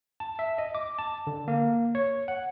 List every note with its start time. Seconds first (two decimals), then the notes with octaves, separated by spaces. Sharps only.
0.20 A5
0.39 E5
0.58 D#5
0.75 D6
0.99 A5
1.27 D3
1.48 A#3
1.95 C#5
2.28 F#5